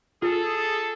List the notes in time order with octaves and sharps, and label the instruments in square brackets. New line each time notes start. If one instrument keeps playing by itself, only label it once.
[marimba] F4 [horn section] G#4 A4